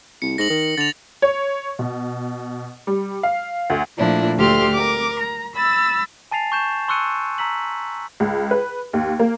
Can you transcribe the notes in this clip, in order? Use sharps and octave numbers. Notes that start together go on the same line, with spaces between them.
C2 C#7
G#2 A#6 F#7
D#3
D3 A6 F7
C#5
B2
G3
F5
D2
A#2 F3 A3 D4 E4
D2 G4 A4 C6 F6
A#4 D6
A#5
B5 E6 A6
G#5 A5 A6 C7 F7
C#6 G6 E7
C6 C#6 E6 F#6 C#7 D#7
A#5 E6 B6 F#7
C#2
B4
D#2
A#3